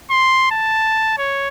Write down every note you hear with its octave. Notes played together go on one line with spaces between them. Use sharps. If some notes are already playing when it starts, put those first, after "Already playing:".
C6
A5
C#5